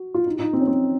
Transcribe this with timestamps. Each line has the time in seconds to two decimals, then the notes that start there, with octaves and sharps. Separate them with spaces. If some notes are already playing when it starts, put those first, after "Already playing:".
Already playing: F#4
0.14 F4
0.26 D#4
0.36 F4
0.39 D#4
0.53 C4
0.60 C#4
0.67 C4